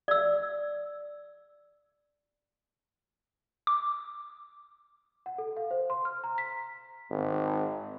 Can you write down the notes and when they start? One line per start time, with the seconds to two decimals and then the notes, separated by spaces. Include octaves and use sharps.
0.08 D5 E6
3.67 D6
5.26 F#5
5.38 A4
5.57 F5
5.71 C5
5.90 C6
6.05 F6
6.24 A#5
6.38 B6
7.10 G#1